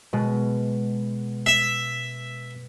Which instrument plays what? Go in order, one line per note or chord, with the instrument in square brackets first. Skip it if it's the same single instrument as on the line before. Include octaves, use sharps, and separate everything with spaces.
[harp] B2 G#3
[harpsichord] E5